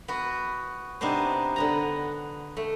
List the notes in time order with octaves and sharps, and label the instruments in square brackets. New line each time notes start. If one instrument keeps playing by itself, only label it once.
[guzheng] B3 F#4
C3 B3 D4 D#4 C5
D3 B3 A#5
A3